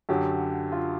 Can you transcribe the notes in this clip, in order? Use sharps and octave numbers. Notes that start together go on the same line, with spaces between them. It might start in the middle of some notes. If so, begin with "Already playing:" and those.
F#2 D3 F#3 G4
F4